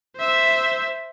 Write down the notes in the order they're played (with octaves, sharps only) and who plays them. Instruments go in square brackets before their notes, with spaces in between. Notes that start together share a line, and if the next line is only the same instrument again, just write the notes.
[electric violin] C5 E5